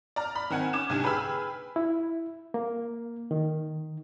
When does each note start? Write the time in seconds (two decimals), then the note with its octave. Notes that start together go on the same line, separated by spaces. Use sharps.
0.16 D5 A#5 F6
0.35 B5
0.50 D#3 C4 F#5 G#5
0.73 C#4 D6 G#6 E7
0.90 C2 G#2 D3 G4 G#5
1.04 G#4 B4 G5 B5 E6 F6
1.76 E4
2.54 A#3
3.31 D#3